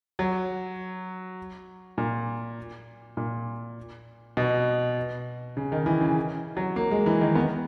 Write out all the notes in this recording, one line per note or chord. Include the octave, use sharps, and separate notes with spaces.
F#3
A#2
A#2
B2
C#3
D#3
E3
C#3
F#3
A#3
G#3
E3
D#3
B3